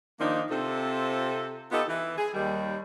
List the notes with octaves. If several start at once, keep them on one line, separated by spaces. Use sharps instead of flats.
D#3 F3 A#3 D4 D#4
C3 C4 F4 A4
B3 D#4 F4 G4 A4
E3
G#4
D#2 D#3 G3